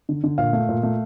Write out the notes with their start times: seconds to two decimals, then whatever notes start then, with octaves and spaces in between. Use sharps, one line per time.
0.09 D3
0.24 D3
0.38 A#2 F5
0.53 A3
0.69 A#2
0.83 A3